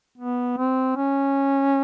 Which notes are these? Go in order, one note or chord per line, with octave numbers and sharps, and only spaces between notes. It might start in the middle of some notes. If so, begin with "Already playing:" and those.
B3
C4
C#4